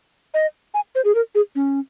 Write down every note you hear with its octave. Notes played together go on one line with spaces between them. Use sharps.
D#5
G#5
C5
G#4
A#4
G#4
C#4